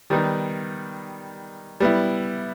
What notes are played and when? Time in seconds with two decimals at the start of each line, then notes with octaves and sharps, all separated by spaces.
0.10 D#3 G3 B3 D#4
1.80 G3 B3 E4